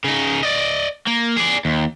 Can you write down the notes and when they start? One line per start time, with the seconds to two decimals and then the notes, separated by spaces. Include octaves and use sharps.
0.04 C#3 D#4
0.43 D5 D#5
1.07 A#3
1.37 G#4 D5
1.65 D#2